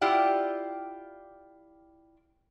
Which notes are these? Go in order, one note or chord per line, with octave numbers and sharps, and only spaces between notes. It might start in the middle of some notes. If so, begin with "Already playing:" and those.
E4 F4 G4 D5 F#5